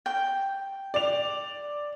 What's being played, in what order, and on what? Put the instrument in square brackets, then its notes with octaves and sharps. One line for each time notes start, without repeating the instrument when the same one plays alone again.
[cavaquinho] G5
[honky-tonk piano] D5 F7